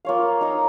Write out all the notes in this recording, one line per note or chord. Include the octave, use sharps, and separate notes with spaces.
A#3 F4 C#5 F5
D#4 A#4 D#5